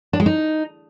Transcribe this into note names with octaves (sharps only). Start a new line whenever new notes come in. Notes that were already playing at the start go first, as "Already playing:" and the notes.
D4
G#3
D#4